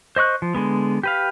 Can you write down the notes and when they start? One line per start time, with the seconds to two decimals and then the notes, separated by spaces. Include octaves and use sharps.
0.16 C5 D#5 C#6 F#6
0.42 F3
0.55 D3 G#3 B3
1.03 G4 B4 F5